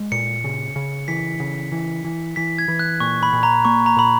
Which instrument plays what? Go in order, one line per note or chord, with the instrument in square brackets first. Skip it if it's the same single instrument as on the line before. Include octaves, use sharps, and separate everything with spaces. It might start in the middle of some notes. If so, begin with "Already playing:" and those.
Already playing: [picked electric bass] G#3
[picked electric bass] A#2 [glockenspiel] C#7
[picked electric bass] C#3
C#3
[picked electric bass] E3 [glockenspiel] B6
[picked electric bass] C#3
E3
E3
[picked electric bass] E3 [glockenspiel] B6
[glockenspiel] G#6
[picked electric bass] E3
[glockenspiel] F#6
[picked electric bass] A#2 [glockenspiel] C#6
[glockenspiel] B5
[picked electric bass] A#2
[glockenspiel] A#5
[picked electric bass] A#3 [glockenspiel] C#6
[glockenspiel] A#5
[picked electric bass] A#2 [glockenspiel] B5